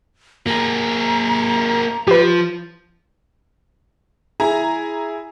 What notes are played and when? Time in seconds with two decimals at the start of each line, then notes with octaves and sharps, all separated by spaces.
0.47 A#3 G#4 A#5
2.07 F3 G4 B4
4.40 E4 G#4 G#5 A#5